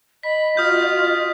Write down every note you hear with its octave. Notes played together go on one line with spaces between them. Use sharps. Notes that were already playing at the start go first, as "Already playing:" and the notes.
D#5 B5 B6
F4 F#4 D#6 F6 G6